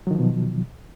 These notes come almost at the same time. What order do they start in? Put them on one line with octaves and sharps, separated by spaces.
F#3 D#3 F3 B2